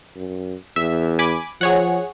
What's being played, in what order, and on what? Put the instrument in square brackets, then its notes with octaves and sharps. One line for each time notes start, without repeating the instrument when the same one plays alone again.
[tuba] F#2
[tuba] E2 [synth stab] E5
[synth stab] G#5 B5 D6
[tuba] F3 [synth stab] G#4 C#5 F#5